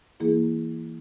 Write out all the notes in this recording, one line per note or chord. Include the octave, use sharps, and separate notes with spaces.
E3 A#3 E4 G#4